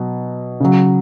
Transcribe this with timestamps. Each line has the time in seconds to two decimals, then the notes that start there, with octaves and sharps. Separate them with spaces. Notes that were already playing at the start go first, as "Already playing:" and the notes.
Already playing: B2 F#3
0.60 C#3 F#3